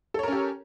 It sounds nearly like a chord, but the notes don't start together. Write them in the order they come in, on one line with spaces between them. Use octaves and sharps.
A4 C#5 A#4 C#4 G4